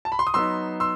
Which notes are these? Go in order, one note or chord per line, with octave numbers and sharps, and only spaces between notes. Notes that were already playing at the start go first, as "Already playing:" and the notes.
A5
B5
C6
D#6
F#3 B3 D#4 C6 E6
C6 E6